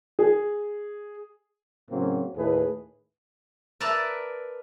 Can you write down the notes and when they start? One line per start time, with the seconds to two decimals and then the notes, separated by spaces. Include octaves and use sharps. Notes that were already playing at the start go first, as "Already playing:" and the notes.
0.19 G#4
1.91 A2 C#3 F#3 A#3 C4 C#4
2.37 D#2 A2 E4 G#4 A4 B4
3.80 A#4 B4 D5 E5 A5 A#5